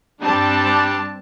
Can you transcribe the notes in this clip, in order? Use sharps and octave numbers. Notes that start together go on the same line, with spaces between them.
G2 G3 C4 D4 A5